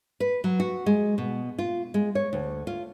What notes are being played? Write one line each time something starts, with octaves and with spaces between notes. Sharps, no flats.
B4
F#3
F#4
G#3
B2
F4
G#3
C#5
D2
F4